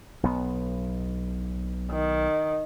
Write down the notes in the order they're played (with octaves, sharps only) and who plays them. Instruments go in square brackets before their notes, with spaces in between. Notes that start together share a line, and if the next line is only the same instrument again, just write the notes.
[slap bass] B1 B3
[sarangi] D#3